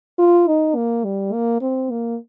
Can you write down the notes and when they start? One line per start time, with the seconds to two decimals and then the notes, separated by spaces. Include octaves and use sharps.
0.19 F4
0.48 D#4
0.76 A#3
1.05 G3
1.33 A#3
1.61 C4
1.91 A#3